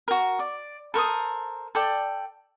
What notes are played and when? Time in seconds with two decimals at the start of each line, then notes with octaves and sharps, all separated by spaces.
0.08 F#4 A#4
0.39 D5
0.94 A4 A#4 C5 D#6
1.75 A4 D5 G5